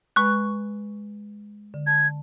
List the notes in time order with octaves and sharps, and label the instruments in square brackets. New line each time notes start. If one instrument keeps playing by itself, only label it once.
[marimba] G#3 B4 B5 [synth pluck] C#6 F#6
[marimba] D3
[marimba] A5 [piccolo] G#6